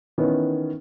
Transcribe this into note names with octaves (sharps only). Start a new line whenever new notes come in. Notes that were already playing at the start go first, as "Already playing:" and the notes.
D#3 E3 B3 C#4 D#4